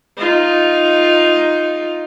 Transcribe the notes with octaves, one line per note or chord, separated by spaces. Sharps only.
D#4 F4